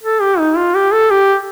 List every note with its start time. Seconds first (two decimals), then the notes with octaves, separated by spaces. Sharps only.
0.03 A4
0.21 G4
0.39 D#4
0.57 F4
0.75 G4
0.93 A4
1.11 G4